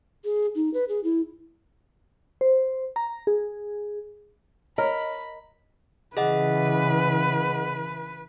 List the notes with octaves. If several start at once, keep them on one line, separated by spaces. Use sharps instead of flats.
G#4
D#4
B4
G#4
E4
C5
A#5
G#4
A#4 C#5 D#5 B5
C#3 E3 G#4 B4 D#5 F#5